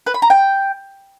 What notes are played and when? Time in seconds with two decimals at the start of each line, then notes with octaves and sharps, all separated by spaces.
0.06 B4
0.14 B5
0.22 A#5
0.30 G5